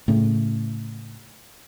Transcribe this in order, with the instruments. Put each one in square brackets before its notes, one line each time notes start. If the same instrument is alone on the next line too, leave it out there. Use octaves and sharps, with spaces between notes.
[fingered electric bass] A2 C#3